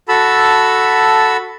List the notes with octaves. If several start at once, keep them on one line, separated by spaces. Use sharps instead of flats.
F#4 A4 A5 B5 E6